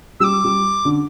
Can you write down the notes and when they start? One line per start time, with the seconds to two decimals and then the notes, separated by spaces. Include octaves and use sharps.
0.20 G3 D6 E6
0.44 G3
0.85 D3